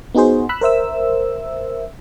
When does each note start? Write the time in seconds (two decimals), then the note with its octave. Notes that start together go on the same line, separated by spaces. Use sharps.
0.14 B3 D#4 F#4 G#4 C5
0.49 B5 E6 F#6
0.61 A#4 C5 E5 E6